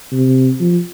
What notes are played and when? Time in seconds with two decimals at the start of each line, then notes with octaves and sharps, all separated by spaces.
0.12 C3
0.60 F3